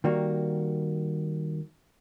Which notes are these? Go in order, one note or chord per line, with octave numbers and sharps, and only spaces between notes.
D#3 G3 A#3 F#4